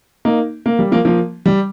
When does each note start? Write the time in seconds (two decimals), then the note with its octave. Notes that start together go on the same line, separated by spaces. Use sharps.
0.25 A#3 D#4
0.66 A#3
0.79 G3
0.92 F3 A#3
1.05 F3 A#3
1.46 G3